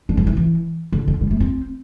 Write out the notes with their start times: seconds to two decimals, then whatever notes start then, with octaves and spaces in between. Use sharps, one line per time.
0.09 D4
0.17 F3
0.27 E3
0.37 E3
0.92 D3
1.08 D3
1.21 G3
1.31 A3
1.40 C4